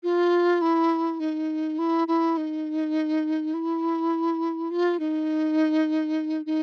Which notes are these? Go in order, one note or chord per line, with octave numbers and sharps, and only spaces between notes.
F4
E4
D#4
E4
E4
D#4
E4
F4
D#4
D#4